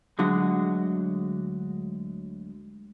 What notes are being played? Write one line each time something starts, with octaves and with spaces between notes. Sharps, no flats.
D2 D3 F#3 G#3 F#4